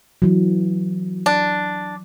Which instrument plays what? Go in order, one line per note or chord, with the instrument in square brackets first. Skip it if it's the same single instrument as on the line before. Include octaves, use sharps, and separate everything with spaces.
[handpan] E3 F#3
[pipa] D4